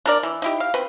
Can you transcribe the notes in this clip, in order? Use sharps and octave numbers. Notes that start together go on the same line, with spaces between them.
D4 A#4 D5
E3
D#4 E4 G4
F5
C4 B4